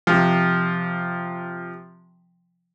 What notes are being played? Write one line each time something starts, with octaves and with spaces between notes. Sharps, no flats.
C3 F3